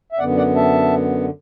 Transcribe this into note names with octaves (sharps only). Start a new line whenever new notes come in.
E5
F#2 D3 B3 D5 F#5
D5 F#5
E5 A5